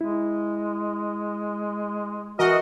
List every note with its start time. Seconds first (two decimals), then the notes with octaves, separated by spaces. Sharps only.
0.01 G#3 E4
2.39 E3 F#4 A#4 D#5 D#6 F6